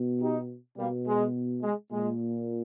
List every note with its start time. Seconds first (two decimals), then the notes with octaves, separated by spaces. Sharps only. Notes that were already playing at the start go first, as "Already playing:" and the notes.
Already playing: B2
0.21 D#4 G4
0.78 B2 G3 A#3
1.07 G#3
1.63 G#3
1.91 A#2 G#3